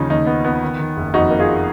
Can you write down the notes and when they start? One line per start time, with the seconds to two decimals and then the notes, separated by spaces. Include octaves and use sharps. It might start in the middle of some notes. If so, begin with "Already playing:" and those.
Already playing: D#2 C#3 F3 D#4
0.10 D#2 D#4
0.27 B3
0.45 B3
0.62 D#3
0.79 D#3
0.96 F#1
1.14 F2 D#4 F#4
1.31 A#3
1.40 F4 G#4